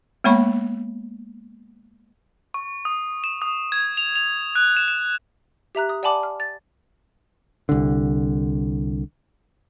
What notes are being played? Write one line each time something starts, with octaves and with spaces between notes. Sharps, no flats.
G#3 A#3 B3 C#5 B5 C#6
C#6
D#6
E7
D#6
G#6
F7
F7
F#6
E7
E7
G4 E5 A#5 F#6
D#6
D5 F#5 G#5 A5 B5 D6
F6
A6
C2 D3